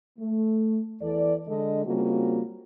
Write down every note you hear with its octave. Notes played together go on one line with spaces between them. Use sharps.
A3
E2 E3 A4 D5
D3 G#3 D4 A4 D#5
C#3 G3 A#3 C4 F4 F#4